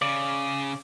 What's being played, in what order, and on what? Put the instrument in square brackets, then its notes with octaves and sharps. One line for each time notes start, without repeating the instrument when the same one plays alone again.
[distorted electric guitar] C#3 [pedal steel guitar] D5